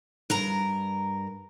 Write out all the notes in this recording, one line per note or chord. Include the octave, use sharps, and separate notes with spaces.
G2 A#4 A#5